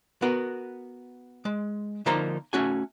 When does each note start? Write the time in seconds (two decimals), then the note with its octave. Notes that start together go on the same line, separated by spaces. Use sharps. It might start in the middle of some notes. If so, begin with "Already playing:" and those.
0.22 B3 F#4 A#4
1.45 G#3
2.06 D3 F3 A#3 D#4 C5 A#5
2.53 A3 C#4 F#4 G#5